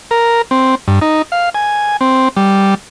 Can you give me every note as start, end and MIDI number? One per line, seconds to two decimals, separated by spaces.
0.11 0.42 70
0.51 0.75 60
0.88 0.99 43
1.01 1.22 63
1.32 1.49 77
1.55 1.97 80
2.01 2.29 60
2.36 2.75 55